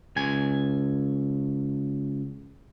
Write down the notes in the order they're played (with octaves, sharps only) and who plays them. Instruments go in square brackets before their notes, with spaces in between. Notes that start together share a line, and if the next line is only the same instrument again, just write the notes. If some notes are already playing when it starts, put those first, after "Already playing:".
[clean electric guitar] C#2 G#5